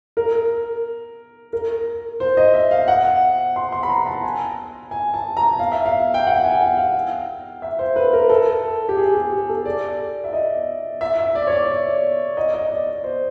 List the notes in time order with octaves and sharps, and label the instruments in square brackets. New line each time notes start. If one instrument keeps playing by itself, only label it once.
[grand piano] A#4
A#4
C5
D#5
E5
F5
F#5
C6
C6
B5
A#5
A5
G#5
G#5
A5
A#5
F5
E5
F5
G5
F#5
G5
G#5
F#5
F5
E5
C5
B4
A#4
A4
G4
G#4
G4
G#4
A4
D5
E5
D#5
E5
E5
D5
C#5
D5
D#5
D#5
D5
C5